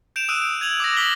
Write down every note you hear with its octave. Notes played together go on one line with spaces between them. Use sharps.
G6 D7 E7 F7
D#6 E6 F#6 D7 D#7
D7
G#6 D#7 F7 F#7
D6 D#6 A#6
D6 F6 B6 F#7 G7